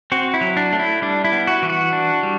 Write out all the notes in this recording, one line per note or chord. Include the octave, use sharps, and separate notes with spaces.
C4 F#4
E4
F#3
D4
A3
E4
G3 D4
E4
B3
F#4
E3
F#4
D4
G3